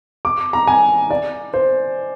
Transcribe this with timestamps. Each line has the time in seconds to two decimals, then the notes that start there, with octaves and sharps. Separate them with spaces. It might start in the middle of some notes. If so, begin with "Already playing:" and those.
0.25 D6
0.53 A#5
0.67 G#5
1.10 D5
1.54 C5